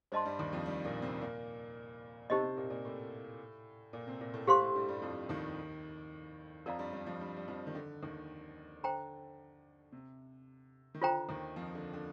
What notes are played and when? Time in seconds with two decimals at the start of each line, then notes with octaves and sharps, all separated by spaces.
0.12 G2 G3 C5 D#5 A5 C6
0.25 G2 G3
0.39 D#2 D#3
0.53 F2 F3
0.66 G2 G3
0.84 A#2 A#3
1.02 C3 C4
1.21 A#2 A#3
2.30 C3 C4 D#4 G4 C5 D#5
2.43 C3 C4
2.57 A#2 A#3
2.70 A#2 A#3
2.85 A2 A3
3.93 A#2 A#3
4.07 C3 C4
4.21 A#2 A#3
4.34 A2 A3
4.47 A2 A3 G4 C5 F5 C6
4.62 A2 A3
4.75 G2 G3
4.89 G2 G3
5.02 F2 F3
5.29 D#2 D#3
6.66 F2 F3 A#4 D5 F5 A#5
6.79 G2 G3
6.93 G2 G3
7.06 F2 F3
7.21 G2 G3
7.37 G3
7.48 F2 F3
7.67 D#3
7.75 D3
8.03 D#2 D#3
8.83 D3 C5 G5 A#5
9.92 C3
10.95 D#3
11.01 D3 F4 C5 G5 A#5
11.29 D#2 D#3
11.56 F2 F3
11.75 D3
11.93 D3